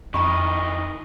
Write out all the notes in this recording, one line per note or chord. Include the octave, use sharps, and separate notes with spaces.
F2 D#3 E3 D#5 A#5 B5 C#6